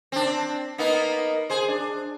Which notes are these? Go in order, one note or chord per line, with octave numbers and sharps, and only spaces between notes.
C4 D4
A#3 B3 D#4
G#4 C5
D4